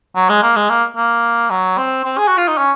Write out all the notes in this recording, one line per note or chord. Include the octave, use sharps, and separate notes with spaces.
F#3
G#3
A#3
G#3
A#3
A#3
F#3
C4
C4
G#4
F#4
F4
D#4
C#4